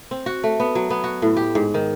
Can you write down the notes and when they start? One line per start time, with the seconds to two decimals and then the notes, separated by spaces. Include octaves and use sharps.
0.11 C4
0.26 F#4
0.44 A3
0.60 B3
0.75 F#3
0.90 B3
1.04 F#4
1.22 A2
1.37 G4
1.55 G#2
1.74 D#3